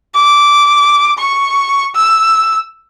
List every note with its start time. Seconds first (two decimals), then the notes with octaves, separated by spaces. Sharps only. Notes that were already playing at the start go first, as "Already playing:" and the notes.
0.15 D6
1.18 C#6
1.96 E6